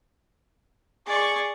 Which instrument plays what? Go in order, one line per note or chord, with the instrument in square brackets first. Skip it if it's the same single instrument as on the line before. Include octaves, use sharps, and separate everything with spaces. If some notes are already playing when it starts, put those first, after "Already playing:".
[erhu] G#4 [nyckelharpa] D5 C#6